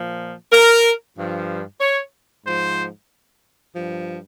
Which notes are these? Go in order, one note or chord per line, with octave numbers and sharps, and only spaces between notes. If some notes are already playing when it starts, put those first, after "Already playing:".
Already playing: A#2 F3
A#4
G2 F3
C#5
G#2 F3 C5
G2 F3